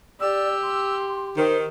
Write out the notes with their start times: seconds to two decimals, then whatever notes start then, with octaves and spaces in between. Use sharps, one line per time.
0.21 G4 D5 E6
0.63 C6
1.37 D#3 C5